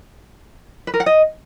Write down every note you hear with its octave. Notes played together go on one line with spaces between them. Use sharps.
B4
A#4
F#5
D#5